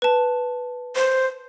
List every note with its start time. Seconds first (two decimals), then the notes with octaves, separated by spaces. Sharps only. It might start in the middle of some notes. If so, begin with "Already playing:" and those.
0.02 B4 A5
0.96 C5